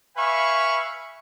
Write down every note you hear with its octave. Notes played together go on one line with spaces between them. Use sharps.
B4 E5 F5 G#5 B5 C#6